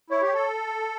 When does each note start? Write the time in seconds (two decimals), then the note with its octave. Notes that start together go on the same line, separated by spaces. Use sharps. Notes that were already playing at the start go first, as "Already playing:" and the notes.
0.10 E4 C#5
0.22 G4
0.34 A4